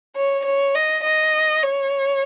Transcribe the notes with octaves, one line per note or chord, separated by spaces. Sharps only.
C#5
C#5
D#5
D#5
C#5